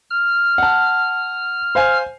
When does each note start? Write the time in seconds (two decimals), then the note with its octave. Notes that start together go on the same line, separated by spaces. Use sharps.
0.10 F6
0.58 F#5 A5
1.75 C5 F5 G#5